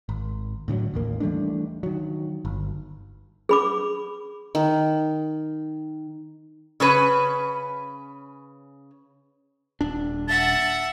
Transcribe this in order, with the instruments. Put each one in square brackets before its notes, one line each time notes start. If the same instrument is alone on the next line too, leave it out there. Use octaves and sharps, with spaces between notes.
[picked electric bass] G#1
A2 D3 F3 F#3
A1 D#2 A#3
E3 G3 A3 D4
D#3 F#3
G1
[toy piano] G#4 B5 D6
[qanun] D#3
[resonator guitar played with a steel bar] C#3 C#4 B4
[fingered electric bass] D#1 D4
[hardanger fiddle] E5 F#5 [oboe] A5